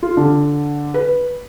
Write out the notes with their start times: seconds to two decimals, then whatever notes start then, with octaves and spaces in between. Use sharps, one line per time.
0.03 F4
0.17 D3
0.94 B4